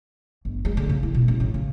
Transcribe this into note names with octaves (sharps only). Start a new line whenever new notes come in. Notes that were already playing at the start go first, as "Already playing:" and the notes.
G1
G#3
D3
C#3
E4
B2
C#2
A1
C#3